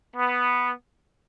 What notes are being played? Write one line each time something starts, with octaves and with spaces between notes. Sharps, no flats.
B3